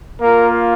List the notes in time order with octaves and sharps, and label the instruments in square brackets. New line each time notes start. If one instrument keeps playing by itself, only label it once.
[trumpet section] A#3 F4 A#4